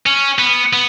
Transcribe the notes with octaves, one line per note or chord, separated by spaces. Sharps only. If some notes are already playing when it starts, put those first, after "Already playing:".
C#4
B3
B3